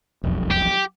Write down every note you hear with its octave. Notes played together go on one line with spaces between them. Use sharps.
E1 B1 F2
G4